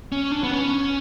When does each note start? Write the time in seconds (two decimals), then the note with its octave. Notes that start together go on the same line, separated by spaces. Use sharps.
0.12 C#4
0.32 D4
0.44 B3
0.52 C#4